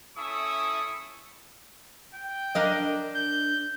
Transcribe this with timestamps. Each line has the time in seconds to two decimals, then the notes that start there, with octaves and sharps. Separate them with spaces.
0.16 C#4 E4 A4 E5 C#6 D#6
2.15 G5
2.55 D4 A#4 D#5
3.16 G6